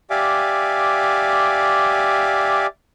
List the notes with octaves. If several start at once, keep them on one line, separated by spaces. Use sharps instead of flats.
G4 D5 E5 F5 G#5 D6